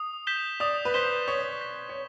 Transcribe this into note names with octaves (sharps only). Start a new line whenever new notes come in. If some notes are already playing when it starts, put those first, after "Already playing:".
Already playing: D#6
G6 B6 E7 G7
D5 D#6
B4
C5 G6 B6 E7 G7
C#5 D#6
G6 B6 E7 G7
C#5